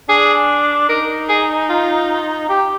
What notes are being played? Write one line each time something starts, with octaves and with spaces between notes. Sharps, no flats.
D4 G#4
D#4 A#4
G#4
F4
G4